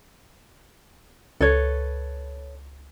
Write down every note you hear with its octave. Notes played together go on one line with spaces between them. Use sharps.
C#2 A4 B4 C#5